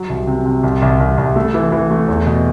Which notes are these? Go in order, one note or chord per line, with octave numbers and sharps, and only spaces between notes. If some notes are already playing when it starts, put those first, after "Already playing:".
Already playing: F#3
C2
C3
C3
C2
C2
C2
C2
A3
E3
E3
A3
E2
B2